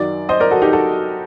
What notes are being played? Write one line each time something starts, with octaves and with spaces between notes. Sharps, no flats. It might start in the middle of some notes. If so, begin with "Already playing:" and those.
Already playing: F#2 D#3 F#3 D5
C5 D#5
A#4 D5
F#4 A4
D#4 G4
F#4 A4